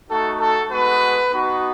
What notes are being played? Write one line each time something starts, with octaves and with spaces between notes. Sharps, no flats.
A3 D#4 F#4 A4
A4
G#3 B3 F#4 B4
B3 D#4 F#4